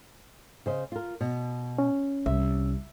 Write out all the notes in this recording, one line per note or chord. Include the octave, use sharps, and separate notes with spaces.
C#3 C5 D#5
F4 A#4
B2
C#4
C2 E5